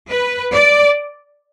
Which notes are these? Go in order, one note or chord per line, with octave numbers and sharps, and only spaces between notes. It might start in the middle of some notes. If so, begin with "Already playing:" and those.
B4
D5